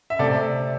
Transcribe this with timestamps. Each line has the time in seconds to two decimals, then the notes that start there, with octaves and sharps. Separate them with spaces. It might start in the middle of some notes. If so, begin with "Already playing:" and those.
0.10 E5
0.19 C3 A4 D5
0.22 A3